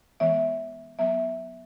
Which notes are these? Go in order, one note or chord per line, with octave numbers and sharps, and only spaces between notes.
E3 G#3 B3 E5
F#3 B3 E5